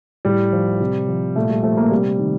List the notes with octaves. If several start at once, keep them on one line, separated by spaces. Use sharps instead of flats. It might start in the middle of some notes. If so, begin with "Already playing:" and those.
A2 G3
F3
C3
F3
A#2 A3
G3
F3 A3
A#3
C3 G3
D#3